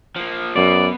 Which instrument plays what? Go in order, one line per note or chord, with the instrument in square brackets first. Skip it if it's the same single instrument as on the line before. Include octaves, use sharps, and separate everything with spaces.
[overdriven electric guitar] F3 A#3
[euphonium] F#2 [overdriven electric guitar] B2 [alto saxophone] D5